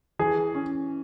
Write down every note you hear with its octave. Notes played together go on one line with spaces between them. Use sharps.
E3 G#4
C#4